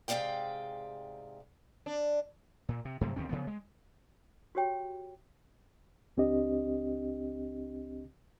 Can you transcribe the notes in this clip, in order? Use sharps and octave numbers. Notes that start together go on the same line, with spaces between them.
G#2 C3 G#4 D5 F5 G5
D4
A#2
C3
G2 C3 F#3 A3
D#2 D3 C4 C#4
C#3 F3 B3
G#3
F#4 G4 C#5 G5
C#2 C4 D4 G4 D#5